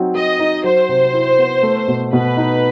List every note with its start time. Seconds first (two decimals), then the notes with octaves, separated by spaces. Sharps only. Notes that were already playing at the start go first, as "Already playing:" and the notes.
Already playing: F#3 C4 D#4
0.15 F#3 D#5
0.40 D#4
0.64 F#3 C5
0.89 C3
1.14 E4
1.39 B3
1.63 A3
1.88 B2
2.13 B2 B4
2.37 D#4